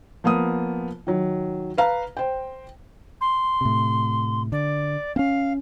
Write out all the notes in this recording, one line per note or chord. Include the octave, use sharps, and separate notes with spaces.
F3 A#3 B3 D#6
D#3 F#3
B4 F5 A#5
C5 G5
C6
A2 C3
D3 D5
C4 C#4 F5